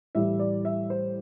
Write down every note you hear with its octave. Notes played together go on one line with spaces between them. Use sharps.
A2 E3 G3 E5
D5
E5
C5